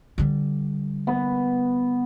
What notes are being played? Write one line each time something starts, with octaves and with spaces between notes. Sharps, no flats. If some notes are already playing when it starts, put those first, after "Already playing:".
D3 G3
B3